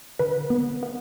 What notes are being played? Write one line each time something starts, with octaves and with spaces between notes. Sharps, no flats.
D3 B4
B3
B3